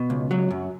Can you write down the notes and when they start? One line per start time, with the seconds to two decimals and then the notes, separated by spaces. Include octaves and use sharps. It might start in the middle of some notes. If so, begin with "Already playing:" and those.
Already playing: B2
0.10 C#2
0.31 F#3
0.51 F#2